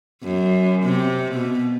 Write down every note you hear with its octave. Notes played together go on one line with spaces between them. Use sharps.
F#2
C3
B2